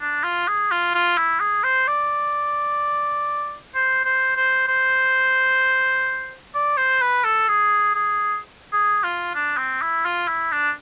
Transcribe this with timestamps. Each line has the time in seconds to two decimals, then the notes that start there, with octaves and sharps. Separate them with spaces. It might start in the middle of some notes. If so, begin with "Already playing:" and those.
0.01 D4
0.23 F4
0.48 G#4
0.71 F4
0.95 F4
1.17 E4
1.40 G#4
1.64 C5
1.87 D5
3.75 C5
4.05 C5
4.36 C5
4.68 C5
6.54 D5
6.77 C5
7.01 B4
7.24 A4
7.48 G#4
7.95 G#4
8.72 G#4
9.03 F4
9.35 D4
9.57 C4
9.82 E4
10.05 F4
10.28 E4
10.52 D4